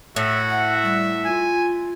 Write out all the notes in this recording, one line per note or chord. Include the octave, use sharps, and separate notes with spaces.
A2 F#4 E5
E5 F#5
G3
F4 G#5